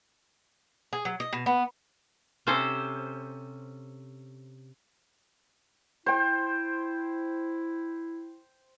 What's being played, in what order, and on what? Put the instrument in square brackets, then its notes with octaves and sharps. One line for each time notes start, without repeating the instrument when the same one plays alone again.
[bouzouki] G#4
F#3
D#5
B2
B3
[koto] C3 C#4 A4 C5
[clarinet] E4 [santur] C5 G5